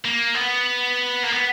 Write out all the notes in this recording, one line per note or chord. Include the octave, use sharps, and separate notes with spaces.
A#3
B3
A#3
B3